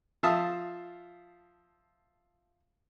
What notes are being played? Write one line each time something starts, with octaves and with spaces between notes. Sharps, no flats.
F3 E5 F5 A5 D#6